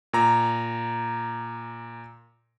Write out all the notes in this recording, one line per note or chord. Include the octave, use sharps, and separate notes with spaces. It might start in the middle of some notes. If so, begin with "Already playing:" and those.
A#2 A#5